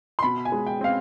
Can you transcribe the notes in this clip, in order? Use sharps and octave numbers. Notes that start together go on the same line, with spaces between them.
C6
B2 B5
G#5
G#3
G5
C4 F5